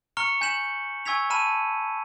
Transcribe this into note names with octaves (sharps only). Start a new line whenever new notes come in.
A#5 C#6 F6 C#7 G7
G#5 G6 B6 E7 F#7
G#5 C#6 E6 G#6 B6 F7
A5 B5 F6 D#7 E7